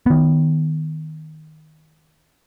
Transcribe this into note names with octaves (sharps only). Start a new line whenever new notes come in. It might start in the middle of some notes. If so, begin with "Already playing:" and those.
D#3 B3